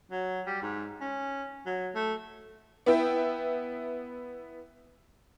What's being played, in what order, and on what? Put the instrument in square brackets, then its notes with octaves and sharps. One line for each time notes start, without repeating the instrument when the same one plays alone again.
[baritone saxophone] F#3
G3
G#2
C#4
F#3
A3
[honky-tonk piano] B3 E4 E5 G5